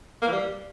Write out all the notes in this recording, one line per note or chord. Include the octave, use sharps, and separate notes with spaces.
A#3
E3
G3